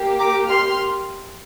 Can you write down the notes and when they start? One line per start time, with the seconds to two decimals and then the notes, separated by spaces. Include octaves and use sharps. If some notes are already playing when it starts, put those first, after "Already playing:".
Already playing: A#3 G4
0.19 A#5 D6
0.47 C6 F6